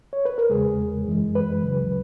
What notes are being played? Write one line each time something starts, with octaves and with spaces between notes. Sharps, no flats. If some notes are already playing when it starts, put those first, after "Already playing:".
C#5
B4
A#4
E2 C#3 G#3 G#4
F#2 E3 G#3
B4
C#2 C#3 F#3